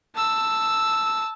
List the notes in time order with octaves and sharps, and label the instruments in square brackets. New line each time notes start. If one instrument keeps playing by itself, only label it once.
[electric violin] A5 E6